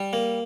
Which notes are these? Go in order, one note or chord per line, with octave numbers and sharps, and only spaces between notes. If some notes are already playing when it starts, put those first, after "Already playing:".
Already playing: G3
A#3